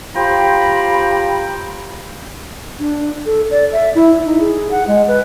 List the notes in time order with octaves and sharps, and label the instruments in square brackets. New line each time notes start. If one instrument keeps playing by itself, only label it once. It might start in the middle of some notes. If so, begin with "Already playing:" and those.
[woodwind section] F4 G4 C5 G5 A#5 B5
[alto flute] D4
A4
D5
E5
E4
D#4
G#4
F#5
G#3
B4